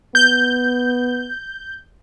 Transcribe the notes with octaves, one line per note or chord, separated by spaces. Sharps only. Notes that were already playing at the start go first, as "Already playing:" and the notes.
B3 G6